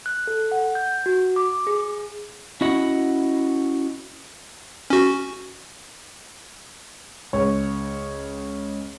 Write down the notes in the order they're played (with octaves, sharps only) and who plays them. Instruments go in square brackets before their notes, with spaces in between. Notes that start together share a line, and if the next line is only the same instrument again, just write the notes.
[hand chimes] F#6
A4
F#5
G6
F#4
D6
G#4
[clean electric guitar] C#4 E4 F#4 D#5 F#5 B5
[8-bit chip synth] C#4 F#4
[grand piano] C#2 C#5 C#6